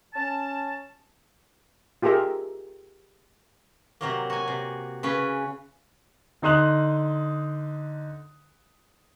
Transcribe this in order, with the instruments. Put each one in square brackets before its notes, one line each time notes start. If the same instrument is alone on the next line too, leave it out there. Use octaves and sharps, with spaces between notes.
[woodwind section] C#4 A5
[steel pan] F4 G4 G#4 A#4 E5 A#5
[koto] C3 F#3 A#3
F#4 G#5
C3
C#3 C#4 B4
[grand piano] D3 D#4 C6 D#6 F#6 F#7